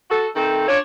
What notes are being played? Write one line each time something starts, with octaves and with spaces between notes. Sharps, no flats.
F#4 A4
D#3 A3 C4 A4
D4 F4 C#5